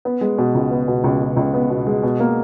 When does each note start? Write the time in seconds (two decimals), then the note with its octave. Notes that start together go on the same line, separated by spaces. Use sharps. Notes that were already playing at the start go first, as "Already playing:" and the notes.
0.05 B3
0.21 G#3
0.38 B2
0.55 C#2
0.71 B3
0.88 B2
1.04 C#2
1.21 B2
1.37 C#2
1.54 B3
1.70 B2
1.87 G#3
2.03 B2
2.20 A#3